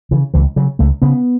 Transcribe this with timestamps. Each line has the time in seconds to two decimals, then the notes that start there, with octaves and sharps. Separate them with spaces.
0.11 C#3 E3
0.34 C#2 E3
0.56 C#3 F#3
0.79 C#2 A3
1.02 C#3 B3